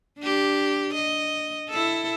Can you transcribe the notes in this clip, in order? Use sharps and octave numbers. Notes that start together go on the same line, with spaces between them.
D4 G4
D#5
E4 A4